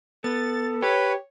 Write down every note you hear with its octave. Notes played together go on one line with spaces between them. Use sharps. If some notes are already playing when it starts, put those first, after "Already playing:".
B3 A4 A6
G4 B4 C#5 B5